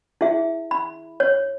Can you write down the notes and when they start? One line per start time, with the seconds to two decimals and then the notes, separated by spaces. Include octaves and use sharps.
0.21 E4 G#4 E5
0.71 B5
1.20 C#5